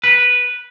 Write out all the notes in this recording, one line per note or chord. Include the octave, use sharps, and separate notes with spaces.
B4